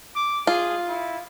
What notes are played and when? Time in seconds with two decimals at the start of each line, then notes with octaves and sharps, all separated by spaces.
0.16 D6
0.47 F4 G#4
0.88 E4